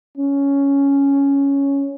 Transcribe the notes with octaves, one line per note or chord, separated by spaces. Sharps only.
C#4